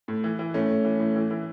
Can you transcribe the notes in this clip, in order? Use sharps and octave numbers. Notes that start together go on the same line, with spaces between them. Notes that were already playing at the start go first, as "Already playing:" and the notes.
A2
E3
E3
A2 A3 C#4
A2
E3
A2
E3
E3